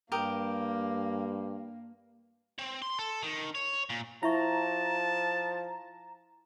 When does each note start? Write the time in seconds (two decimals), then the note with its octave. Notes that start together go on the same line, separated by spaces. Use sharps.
0.12 G2 A#3 G4 A#4 D#6
2.59 C4
2.82 C6
2.99 A4
3.23 D#3
3.55 C#5
3.90 A#2
4.23 F3 E4 E5 A5 A#5 C#6